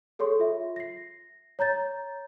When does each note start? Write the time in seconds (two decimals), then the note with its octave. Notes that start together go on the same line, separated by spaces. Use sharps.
0.19 G#4 A4 C#5 C6 C#6
0.39 F4 E5
0.76 A#6 C7
1.59 C#5 A#5 G6 A6